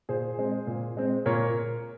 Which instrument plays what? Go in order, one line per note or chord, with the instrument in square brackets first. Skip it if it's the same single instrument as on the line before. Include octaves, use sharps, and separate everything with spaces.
[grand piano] A#2 G#4 C5
G#3 C4
A#2
G#3 C4
A#2 A#4 C#5